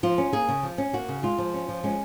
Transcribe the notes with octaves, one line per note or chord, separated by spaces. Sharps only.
F3 F4
C#4
A#3 G#4
C#3
F3
C#4
A#3 F#4
C#3
G#3 F4
F3
C#4
F3
G#3 C#4